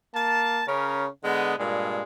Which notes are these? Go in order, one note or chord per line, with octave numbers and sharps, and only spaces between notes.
A#3 A5
C#3 C#4 A#4
D3 G#3 B3
G2 A#2 G#3